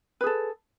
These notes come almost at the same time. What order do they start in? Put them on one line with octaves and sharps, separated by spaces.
B4 G#4 A4